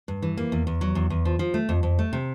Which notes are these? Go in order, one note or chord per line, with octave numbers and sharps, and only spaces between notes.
G2
E3
A#3
E2
E2
F#3
E2
E2
F3
F3
A3
F2
F2
A3
C3